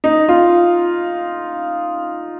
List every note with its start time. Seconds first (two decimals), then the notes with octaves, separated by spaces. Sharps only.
0.04 D#4
0.29 F4